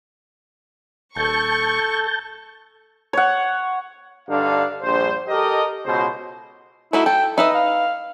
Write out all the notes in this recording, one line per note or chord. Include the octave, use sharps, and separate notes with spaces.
D#1 A4 A5 C#6 G6
C#5 F#5
G2 D3 D4 D#4 F5
A#1 G2 C5
G4 A4 A#4 D#5
C#2 B2 C5
A3 D#4 E4 F#4
A4 G5
D#4 B4 D#5 E5
F5